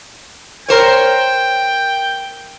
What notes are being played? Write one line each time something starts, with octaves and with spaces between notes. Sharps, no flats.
A#4 C5 C#5 G5